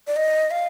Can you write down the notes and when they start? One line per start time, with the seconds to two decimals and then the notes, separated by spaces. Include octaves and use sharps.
0.07 D5
0.16 D#5
0.51 F5